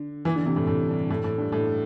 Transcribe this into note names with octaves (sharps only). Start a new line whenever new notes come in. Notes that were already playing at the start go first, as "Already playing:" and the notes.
Already playing: D3
E3
D3
C3
A2
A2
G2
A2
A2
G2
A2